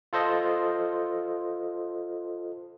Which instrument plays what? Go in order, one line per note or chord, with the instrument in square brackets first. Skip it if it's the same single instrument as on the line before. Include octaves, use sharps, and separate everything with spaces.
[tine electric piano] F4 A4 C5 D#5